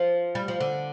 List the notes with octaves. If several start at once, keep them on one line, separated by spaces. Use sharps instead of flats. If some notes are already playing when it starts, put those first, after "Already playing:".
Already playing: F3
G3
F3
D3